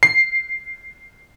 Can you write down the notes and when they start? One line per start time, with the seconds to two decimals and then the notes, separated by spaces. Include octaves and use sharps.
0.03 C7